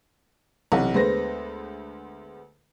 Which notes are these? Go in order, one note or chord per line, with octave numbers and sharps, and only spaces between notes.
B1 C3 E3 F#5
D2 G#3 B3 B4 C5 A#6